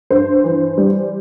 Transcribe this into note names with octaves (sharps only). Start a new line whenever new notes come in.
G2 C5
E3
G3